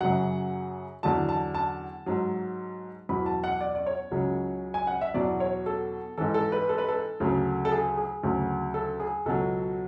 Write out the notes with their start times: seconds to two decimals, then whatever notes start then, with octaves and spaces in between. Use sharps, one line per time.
0.01 F#2 C#3 F#3 F#5
1.03 E2 D3 F#3 A5
1.29 A5
1.54 A5
2.06 G#2 F#3
3.09 E2 B2 F#3 B5
3.26 A5
3.44 F#5
3.61 D5
3.75 D5
3.86 C#5
4.11 C#2 C#3 F#3
4.74 G#5
4.87 F#5
5.01 E5
5.14 E2 B2 F#3 D5
5.40 C#5
5.66 A4
6.18 G#2 E3 A4
6.34 A4
6.52 B4
6.69 A4
6.78 B4
6.89 A4
7.20 D2 C#3 F#3
7.65 A4
7.72 G#4
7.97 G#4
8.23 D2 C#3 F#3
8.74 A4
9.00 G#4
9.26 C#2 B2 F#3 A4